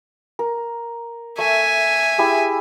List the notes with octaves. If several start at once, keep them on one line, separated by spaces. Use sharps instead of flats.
A#4
A3 E5 G#5
E4 G4 G#4